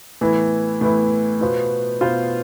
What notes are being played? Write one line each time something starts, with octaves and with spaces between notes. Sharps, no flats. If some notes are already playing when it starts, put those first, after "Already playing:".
A2 E3 B3 E4
A2 E3 B3 E4
B2 B3 F4 C5
B2 B3 F4 C5